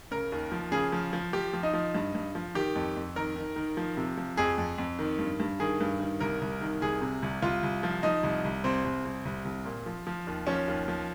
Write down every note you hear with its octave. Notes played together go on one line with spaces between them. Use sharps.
C#3 A#4
D#2
F3
C#3 G#4
F3
F3
F3 G4
F3
D#4
F3
G2
G2
F3
D#3 G4
F2
F2
D#3 A#4
D#3
D#3
F3
C3
F3
F2 G#4
F2
F2
D#3
G2
G2
D#3 G#4
G2
D#3
C2 A#4
C2
D#3
C2 G#4
C3
C2
C2 F4
C2
F3
F3 D#4
C2
C2
C2 C4
C2
C2
C2
C2
A#2
F3
F3
D#2
F3 C#4
D#2
F3